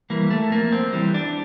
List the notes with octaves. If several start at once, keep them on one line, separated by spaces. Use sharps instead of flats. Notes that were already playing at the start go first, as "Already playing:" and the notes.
E3 G3 A#3
A3
F2 A#3
C4
E3 G3
D4